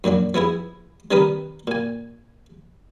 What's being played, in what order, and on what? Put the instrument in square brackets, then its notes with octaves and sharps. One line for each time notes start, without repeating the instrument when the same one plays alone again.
[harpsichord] F#2 A#2 F#3 D4
F3 B3 E4 G#4
C3 D#3 G3 A#4 B4 D#6
A#2 G#5